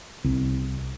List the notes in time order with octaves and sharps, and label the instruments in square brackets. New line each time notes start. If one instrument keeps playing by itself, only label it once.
[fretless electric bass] C2